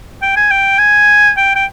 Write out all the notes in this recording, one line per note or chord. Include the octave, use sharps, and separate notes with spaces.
G5
G#5
G5
G#5
G5
G5